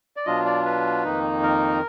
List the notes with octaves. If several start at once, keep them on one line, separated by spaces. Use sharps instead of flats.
D5
B2 F#3 D4 F4 D#5
D5
B4
F2 D#3 A#3 D#4
A#4